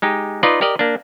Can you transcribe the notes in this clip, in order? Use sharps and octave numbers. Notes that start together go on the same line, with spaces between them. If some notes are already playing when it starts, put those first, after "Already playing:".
G#3 D#4 G4
D#4 F4 B4 D5 D#5
G4 A#4 D5 D#5
A#3 D4